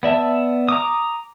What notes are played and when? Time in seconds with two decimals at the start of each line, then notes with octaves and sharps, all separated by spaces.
0.03 B3 D5 E5 A5
0.69 A#5 D6 D#6